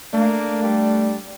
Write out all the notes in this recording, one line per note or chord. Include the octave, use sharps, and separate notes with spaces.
A3 A#3 D4
G3